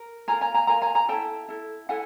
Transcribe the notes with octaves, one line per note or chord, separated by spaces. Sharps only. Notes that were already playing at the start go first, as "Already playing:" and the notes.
Already playing: A#4
F4 A#4 G#5 A#5
G#5 A#5
G#5 A#5
F4 A#4 G#5 A#5
G#5 A#5
G#5 A#5
E4 A4 G5 A5
E4 A4
E4 A4 F#5 G#5